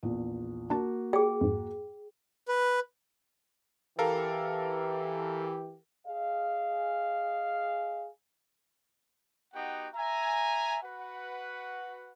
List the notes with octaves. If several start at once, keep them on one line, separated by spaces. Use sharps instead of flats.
A#1 E2
A#3 D4 F#4 A5
G4 G#4 C#5 D5 G5
F2 G#2
B4
E3 G4 A4 A#4 F5
G#4 D#5 F5
B3 D#4 F#4 G4 F#5 G5
E5 G#5 A#5
F#4 B4 F#5